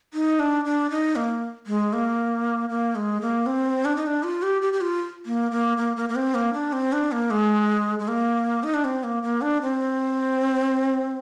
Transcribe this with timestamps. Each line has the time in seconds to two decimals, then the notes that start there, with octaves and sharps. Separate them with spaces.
0.14 D#4
0.39 D4
0.65 D4
0.90 D#4
1.16 A#3
1.67 G#3
1.93 A#3
2.69 A#3
2.95 G#3
3.21 A#3
3.46 C4
3.85 D4
3.96 D#4
4.06 D4
4.23 F4
4.42 G4
4.62 G4
4.73 G4
4.81 F4
5.26 A#3
5.51 A#3
5.77 A#3
5.97 A#3
6.09 A#3
6.15 C4
6.34 A#3
6.53 D4
6.73 C4
6.92 D4
7.12 A#3
7.30 G#3
7.99 G#3
8.08 A#3
8.63 D#4
8.74 D4
8.84 C4
9.03 A#3
9.23 A#3
9.41 D4
9.62 C4